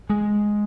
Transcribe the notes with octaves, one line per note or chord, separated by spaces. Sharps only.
G#3